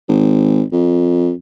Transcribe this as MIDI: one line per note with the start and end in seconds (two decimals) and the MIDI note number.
0.08 0.63 32
0.72 1.32 41